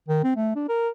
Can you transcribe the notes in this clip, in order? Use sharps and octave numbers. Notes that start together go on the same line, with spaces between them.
D#3
C4
A3
D4
A#4